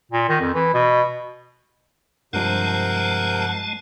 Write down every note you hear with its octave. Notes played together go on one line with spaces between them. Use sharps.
A#2
D#3
F2
E3
B2
G2 C3 F3 G#3 A#4 F#5 A5 G6